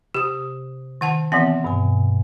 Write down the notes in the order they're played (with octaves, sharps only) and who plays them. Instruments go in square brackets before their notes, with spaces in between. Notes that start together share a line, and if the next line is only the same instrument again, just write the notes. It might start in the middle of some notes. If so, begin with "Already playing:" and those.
[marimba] C3 D#6 [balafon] G4
[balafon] D#3 F#5 A5
[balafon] E3 B3 C4 [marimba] E5 F#5 C6
[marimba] G2 B2 G#5